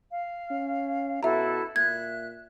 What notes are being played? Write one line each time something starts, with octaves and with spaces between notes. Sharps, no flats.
F5
C#4
B2 E4 F#4 A4 E5 A#5
A#2 E5 F#6 G#6